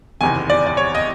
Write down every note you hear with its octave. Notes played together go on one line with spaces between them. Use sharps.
F#1 E2 C3 D#3 G#5
D5
D5
C#5
D#5